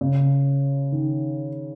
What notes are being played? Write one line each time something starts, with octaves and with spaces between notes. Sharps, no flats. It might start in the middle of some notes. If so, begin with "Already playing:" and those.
C#3
D#3